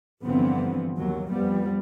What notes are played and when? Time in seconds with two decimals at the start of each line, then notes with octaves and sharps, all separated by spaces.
0.24 G1 D3 E3 F3 B3 C4
0.98 D#2 F#3
1.31 F2 F3 G3 B3